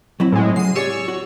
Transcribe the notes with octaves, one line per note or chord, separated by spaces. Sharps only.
F#3 C4 E4
A2 G#3
C#3 F#3 C7 D#7
G4 G#4 C#5 D5 C#6 E6
F#4